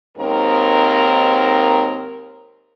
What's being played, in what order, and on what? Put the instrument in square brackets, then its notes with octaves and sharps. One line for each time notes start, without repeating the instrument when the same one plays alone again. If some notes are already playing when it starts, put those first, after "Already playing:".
[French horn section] D#2 G#2 C4 A#4